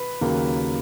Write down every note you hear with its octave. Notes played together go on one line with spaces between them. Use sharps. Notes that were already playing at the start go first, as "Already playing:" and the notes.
Already playing: B4
D#2 C#3 F#3 A#3